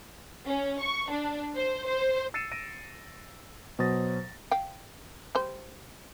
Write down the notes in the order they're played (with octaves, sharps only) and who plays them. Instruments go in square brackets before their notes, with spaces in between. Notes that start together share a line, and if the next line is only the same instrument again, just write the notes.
[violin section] C#4
C#6
D4
C5
C5
[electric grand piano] E6 A6 C7 C#7 D#7 E7
A#6 D7 D#7
B2 F#3 C5 D#6 A6 A#6
[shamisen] F5 G5
G3 C5